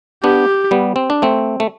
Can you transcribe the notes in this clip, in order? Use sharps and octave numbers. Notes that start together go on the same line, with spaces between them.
B3 D4 G4
G3 B3
C4
D4
A3 C4
A3